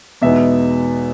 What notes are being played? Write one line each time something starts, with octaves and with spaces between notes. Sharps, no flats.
E2 B2 G#3 B3 D#4 E5